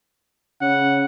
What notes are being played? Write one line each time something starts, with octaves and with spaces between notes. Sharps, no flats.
C#3 F#5